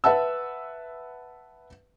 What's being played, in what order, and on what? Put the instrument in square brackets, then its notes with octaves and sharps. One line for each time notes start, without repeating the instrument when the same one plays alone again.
[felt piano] B4 E5 F#5 A5 E6